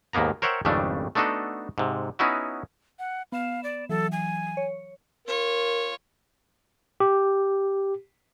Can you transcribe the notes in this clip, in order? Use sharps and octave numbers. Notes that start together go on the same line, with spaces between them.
D#2 G#2 A#3 B3 A#5
A#4 C5 C#5 E5 F#5 G5
G#1 F2 C#3 G3 A3 D4
A3 B3 D4 D#4 F#4 A4
G#2 C3
B3 C#4 D#4 E4 F#4
F#5
B3 F5 E7
D5
E3 F#3 A4
G#5
C#5
F4 A#4 C#5
G4